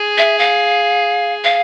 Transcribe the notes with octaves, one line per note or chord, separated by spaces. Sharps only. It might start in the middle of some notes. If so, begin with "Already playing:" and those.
Already playing: G#4
E5
F5
F5